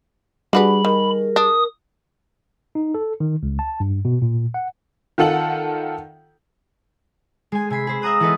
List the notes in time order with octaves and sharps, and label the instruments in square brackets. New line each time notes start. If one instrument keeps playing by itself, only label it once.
[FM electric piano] G3 G#4 [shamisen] D4 F#4 B4 [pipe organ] B5
[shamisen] D#3 [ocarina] A#4
[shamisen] D4 [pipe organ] D#6
[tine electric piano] D#4
A4
D#3
C#2
A5
G2
B2
A#2
F#5
[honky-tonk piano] D#3 F4 A4 F#5 F#7
[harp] G#3 G#5
C3 G#5 B5 C7
G#4 B4 C5
E5 F#5 A#5 D#6 F#6
E3 B3 A4 B4 D#5